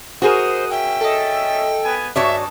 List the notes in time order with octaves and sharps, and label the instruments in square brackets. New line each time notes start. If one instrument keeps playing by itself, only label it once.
[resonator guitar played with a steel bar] F#4 G#4 A#4 [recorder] C5 [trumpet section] D#5 F#5 D#6
[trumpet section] C#4 E5 [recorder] G5
[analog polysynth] A4 D#5
[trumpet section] B3 B4 G#5
[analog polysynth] G2 [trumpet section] G#3 D#4 A5 [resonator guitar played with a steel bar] F#4 C#5 D5 [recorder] E5